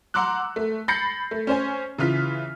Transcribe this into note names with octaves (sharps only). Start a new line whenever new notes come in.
F#5 A#5 C6 D6 E6 F#6
A3
B5 G6 A6 A#6 C7 C#7
A3
C#4 C5 C#5 G#5
C#3 E3 F4 F6 B6